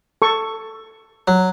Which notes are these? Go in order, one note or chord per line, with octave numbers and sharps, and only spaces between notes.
A4 C#6
F#3